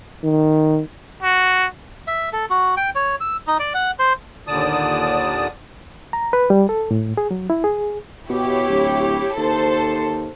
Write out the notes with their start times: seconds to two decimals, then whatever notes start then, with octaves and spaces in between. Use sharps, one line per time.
0.24 D#3
1.22 F#4
2.07 E5
2.33 A4
2.50 F#4
2.77 G5
2.95 C#5
3.21 E6
3.47 D#4
3.59 D5
3.74 F#5
3.99 C5
4.47 D#2 A#2 D3 D5 A5 D#6
6.13 A#5
6.33 B4
6.50 G3
6.69 A4
6.91 A2
7.17 G#4
7.31 F#3
7.50 E4
7.64 G#4
8.29 B2 E4 G4 C#5
8.70 D1
9.37 D#2 A4 C5